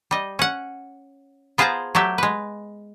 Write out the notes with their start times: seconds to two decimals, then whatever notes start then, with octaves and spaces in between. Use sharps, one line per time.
0.11 G3 D#5
0.39 C#4 F#5
1.58 B3 F4 G#4 C5 A5 A#5
1.95 F#3 A3 G4 E5
2.18 G#3 B4